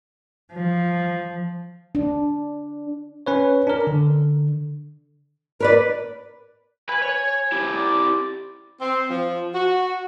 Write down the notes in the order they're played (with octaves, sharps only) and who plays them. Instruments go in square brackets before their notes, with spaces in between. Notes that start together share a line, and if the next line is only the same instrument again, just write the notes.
[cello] F3
[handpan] D4
[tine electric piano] C#4 B4 C#5
D4 A#4
D3
[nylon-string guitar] A#4 C#5 D5 [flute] B4
[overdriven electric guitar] B4 B5 [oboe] G#5
[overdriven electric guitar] C#5
E4 G4
[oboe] D5
[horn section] C4
F3
F#4